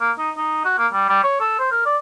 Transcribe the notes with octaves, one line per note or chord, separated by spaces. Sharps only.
A#3
D#4
D#4
F#4
A#3
G3
G3
C#5
A4
C5
A#4
D5